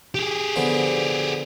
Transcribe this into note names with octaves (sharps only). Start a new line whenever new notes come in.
G4 G#4
D3 F3 B3